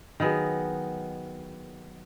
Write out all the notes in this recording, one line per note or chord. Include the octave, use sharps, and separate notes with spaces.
D#3 F#3 B3 G#4